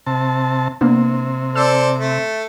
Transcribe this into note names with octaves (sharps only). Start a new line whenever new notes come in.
C3 A5
C3 A#3 B3 D4
A4 C5 D5 E6
A3